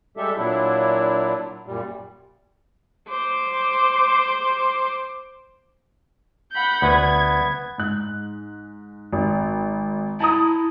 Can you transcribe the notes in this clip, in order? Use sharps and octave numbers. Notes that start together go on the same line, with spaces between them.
G3 G#3 G4 A4 E5
A#2 F#3 D4 E4
F#2 A#2 G3
C5 D6
F#5 B5 G6
D2 B3 B4 G#6
G#2 F#6
G#1
E4 A5 A#5 D#6